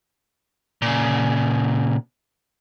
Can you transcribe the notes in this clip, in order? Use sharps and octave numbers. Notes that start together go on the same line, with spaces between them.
A#2 C#3